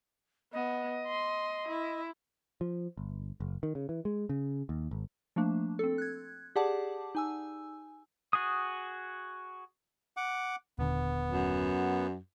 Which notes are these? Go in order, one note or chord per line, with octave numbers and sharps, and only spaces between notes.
B3 D#5
C6
E4
F3
G1
F#1
D#3
C#3
E3
G#3
C#3
D#2
G#1
F3 A3 A#3 D4
C4 A4
F#6 G#6
G4 G#4 D5 F#5 A5 D6
D#4 G#5 E6
F#4 G#4 D#6
F#5 D6
D#1 D3 B3
F#2